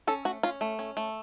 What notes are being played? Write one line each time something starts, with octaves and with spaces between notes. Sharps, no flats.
C#4 A4
A3 F#4
C#4 F4
A3
C#4
A3